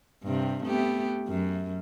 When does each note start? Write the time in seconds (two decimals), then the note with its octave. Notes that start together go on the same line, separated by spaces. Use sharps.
0.24 G2 C3
0.64 A3 B3 G4
1.28 F#2